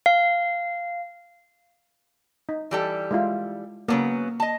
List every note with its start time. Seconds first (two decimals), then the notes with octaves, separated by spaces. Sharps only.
0.06 F5
2.49 D#4
2.71 E3 G3 A4
3.11 G#3 E4 F4
3.88 C#3 F#3 A#3 B3
4.40 D#5 A5